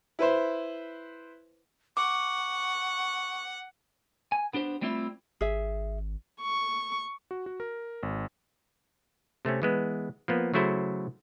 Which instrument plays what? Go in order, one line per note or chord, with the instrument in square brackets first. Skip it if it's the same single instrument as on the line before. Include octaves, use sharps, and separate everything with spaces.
[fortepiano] E4 B4 C5
[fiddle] F#5 [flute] C#6 [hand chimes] D6
[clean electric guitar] G#5
B3 D4 G4 C5
G3 A3 C4 E4 F4 E5
[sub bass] G#1 [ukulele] G#4 E5
[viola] C#6
[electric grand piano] F#4
F#4
A#4
G#1
[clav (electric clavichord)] C3 A3 C4 C#4
E3 G#3 B3
F3 A#3 B3
C#3 F#3 A3 E4 F#4 C5